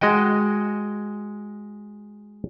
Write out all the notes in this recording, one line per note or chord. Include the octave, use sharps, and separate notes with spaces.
G#3 F#4 D#5 G5